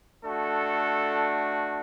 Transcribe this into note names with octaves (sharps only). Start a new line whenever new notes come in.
A3 D4 F#4 A4